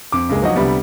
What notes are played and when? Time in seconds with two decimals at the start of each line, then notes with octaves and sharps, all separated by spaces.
0.12 F2 D6
0.29 C#2 G2 G#3 A#3
0.42 F3 F#3 D#4 F#4 D#5
0.55 C2 D3 G3 B3